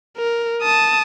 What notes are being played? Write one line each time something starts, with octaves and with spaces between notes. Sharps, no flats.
A#4
A5 D#6